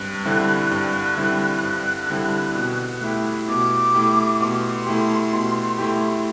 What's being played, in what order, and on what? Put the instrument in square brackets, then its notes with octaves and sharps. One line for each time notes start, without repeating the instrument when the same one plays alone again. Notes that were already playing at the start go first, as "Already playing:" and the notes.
Already playing: [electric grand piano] G2 G3 C4 [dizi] F#6
[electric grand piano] D3 G3 C4 E4
G2
D3 G3 C4 E4
G2
D3 G3 C4 E4
B2
A3 E4 G4
[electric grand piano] B2 [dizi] D6
[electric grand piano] A3 E4 G4
[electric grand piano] B2 [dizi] C6
[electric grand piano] A3 E4 G4
B2
A3 E4 G4